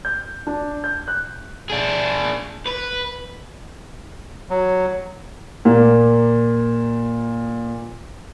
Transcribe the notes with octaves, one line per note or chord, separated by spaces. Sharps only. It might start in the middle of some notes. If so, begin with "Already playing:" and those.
G6
D4
G6
F#6
D4 G#4
B4
F#3
A#2 A#3